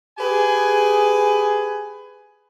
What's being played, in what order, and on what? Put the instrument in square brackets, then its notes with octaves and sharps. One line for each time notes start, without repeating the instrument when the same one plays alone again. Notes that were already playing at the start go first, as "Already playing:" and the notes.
[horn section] G4 G#4 B4 G#5